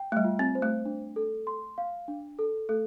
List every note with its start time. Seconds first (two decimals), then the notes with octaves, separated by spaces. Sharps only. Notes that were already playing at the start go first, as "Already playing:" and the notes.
Already playing: G5
0.12 A3
0.17 G3
0.24 F4
0.39 C4
0.55 C5
0.62 A3
0.85 D4
1.16 A4
1.47 C6
1.78 F5
2.08 D4
2.39 A4
2.69 A3 A4